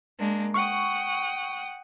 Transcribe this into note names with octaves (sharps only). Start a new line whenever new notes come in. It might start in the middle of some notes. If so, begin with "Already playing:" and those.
G#3 A#3 D4
F#5 G5 C#6 D#6